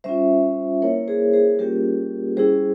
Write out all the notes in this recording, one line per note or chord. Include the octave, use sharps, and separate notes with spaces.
G3 C#4 F4 C5 E5
A#3 E4 A#4 C#5
G#4 C5
G#4 C5
G3 A#3 C#4 F4 G4 A#4
G3 C#4 E4 G#4 C5